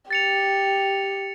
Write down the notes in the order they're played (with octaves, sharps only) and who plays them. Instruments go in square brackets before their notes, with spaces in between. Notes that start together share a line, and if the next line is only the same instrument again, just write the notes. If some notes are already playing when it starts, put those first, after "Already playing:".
[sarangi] G4 [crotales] A6 C#7 F7